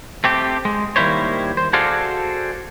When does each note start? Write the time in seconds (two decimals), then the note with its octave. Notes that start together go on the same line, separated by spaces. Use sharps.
0.24 A3 C4 G4
0.65 G#3
0.96 D#3 G3 A#3 E4 C5 C#5
1.57 C5
1.73 F#4 G#4 A4 C5 D5 F5